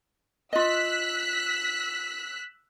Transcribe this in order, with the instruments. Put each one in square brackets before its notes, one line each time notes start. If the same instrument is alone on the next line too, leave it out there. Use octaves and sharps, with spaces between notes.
[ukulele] F4 D#5 [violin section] E6 F#6 B6